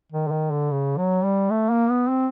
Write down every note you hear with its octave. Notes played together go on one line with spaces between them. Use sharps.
D#3
D3
D#3
D3
C#3
F#3
G3
A3
A#3
B3
C4